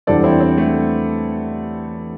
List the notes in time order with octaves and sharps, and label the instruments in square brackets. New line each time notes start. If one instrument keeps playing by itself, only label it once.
[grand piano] E2 E3 G3 D4 C5 [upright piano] A4 D5
[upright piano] C4 E4
C4
A3